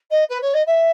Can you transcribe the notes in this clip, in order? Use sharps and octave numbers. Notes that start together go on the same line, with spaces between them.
D#5
B4
C#5
D#5
E5